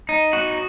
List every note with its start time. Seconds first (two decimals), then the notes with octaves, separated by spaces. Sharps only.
0.09 D#4
0.33 F#4